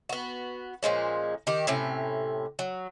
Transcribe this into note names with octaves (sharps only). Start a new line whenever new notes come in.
B3 F#4
A#2 F3 G#3 C#4
D#3 G4
A2 C3 C#4
F#3